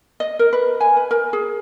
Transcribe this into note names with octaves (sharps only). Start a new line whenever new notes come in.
D#5
A#4
B4
G#5
B4
A#4
G#4